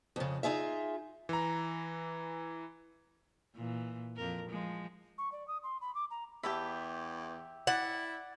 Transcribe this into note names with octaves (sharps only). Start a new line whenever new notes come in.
F2 C#3
D#4 F4 G#4 E5
E3 A#5
A#2 E3
F2 A#4
F3 G#3
C#6
D5
D#6
C6
B5
D6
A#5
E2 G4 E5 A5 B5
E4 D5 F#5